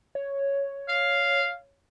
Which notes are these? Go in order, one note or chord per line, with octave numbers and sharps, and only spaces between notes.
C#5
F5